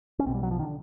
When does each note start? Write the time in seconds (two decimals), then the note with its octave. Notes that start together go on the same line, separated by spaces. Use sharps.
0.19 C#4
0.26 B1 C4
0.29 B2
0.34 G3
0.43 F#3
0.51 F3
0.59 D#3
0.63 D3